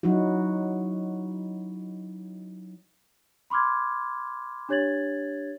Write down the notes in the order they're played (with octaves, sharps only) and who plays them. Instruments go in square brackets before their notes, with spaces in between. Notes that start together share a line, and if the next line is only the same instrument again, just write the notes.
[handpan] F#3 D#4 E4 F#4
[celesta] B5 C6 D6 F6 G#6
D4 G4 C#5 G#6 A6 F#7